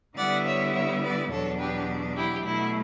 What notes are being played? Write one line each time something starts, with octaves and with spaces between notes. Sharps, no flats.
D3 G3 B3 E4 D5 F#5
C#5 E5
C#5 E5
B4 D5
E2 B2 F#3 B3 D4 A4 C#5
G4 B4
E4 G4
B2 F#3 A3 E4